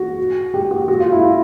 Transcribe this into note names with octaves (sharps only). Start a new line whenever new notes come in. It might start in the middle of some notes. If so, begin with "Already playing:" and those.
Already playing: F#4
G4
F#4
F#4
F4
E4
F4